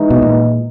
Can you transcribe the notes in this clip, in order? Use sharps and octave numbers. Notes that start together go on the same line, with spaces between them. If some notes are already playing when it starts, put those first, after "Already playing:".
Already playing: E3 G#3 D#4
B2
A#2